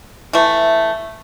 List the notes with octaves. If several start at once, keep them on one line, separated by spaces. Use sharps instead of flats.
E3 A3